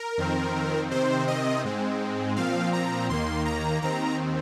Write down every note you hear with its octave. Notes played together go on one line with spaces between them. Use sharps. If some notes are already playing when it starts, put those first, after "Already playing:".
Already playing: A#4
F2 D#3 C4
C3 D#3 C4 C5
D#5
G#2 G#3 C4
A#2 F3 C4 F5
A#5
D#2 D#3 A#3 C6
A#5
D#2 D#3 C4 A#5